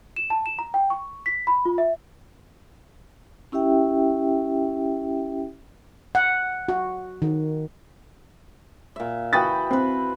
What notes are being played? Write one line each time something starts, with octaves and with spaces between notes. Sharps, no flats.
E7
A5
E7
A#5
G5
C#6
B6
B5
F4
E5
C#4 E4 G4 E5 G5
F#5
F#4
D#3
A#2 E5
E3 F#4 G5 B5 D#6 A6
C4 B4 B5